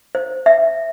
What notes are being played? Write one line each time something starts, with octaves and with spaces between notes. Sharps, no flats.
C5
E5